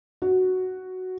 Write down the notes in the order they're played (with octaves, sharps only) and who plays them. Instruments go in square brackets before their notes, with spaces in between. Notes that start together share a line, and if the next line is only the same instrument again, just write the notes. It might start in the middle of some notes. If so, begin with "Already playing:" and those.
[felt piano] F#4